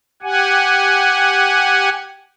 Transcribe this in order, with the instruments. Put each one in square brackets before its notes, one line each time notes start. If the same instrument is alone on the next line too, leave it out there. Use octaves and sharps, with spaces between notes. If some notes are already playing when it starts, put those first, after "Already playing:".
[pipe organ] G4 F#5 G#5